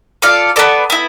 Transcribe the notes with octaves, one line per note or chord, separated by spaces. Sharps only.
F4 A4 D5 F5
B3 F4 A4 D5
B3 E4